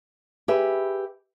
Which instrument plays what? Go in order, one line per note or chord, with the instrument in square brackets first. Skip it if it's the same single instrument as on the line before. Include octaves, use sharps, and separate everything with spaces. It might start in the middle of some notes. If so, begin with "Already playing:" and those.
[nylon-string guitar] G4 G#4 B4 E5